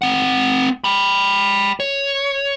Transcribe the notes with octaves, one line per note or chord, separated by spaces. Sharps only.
C4 F#5
G5 B5
C#5